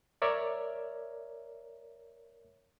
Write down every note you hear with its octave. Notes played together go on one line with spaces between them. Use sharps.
A#4 C#5 D5 E5